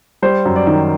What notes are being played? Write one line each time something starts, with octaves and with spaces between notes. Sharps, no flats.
G3 C5
F#2
D5
D#3